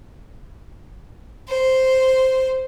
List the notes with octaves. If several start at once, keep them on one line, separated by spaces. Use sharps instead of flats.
C5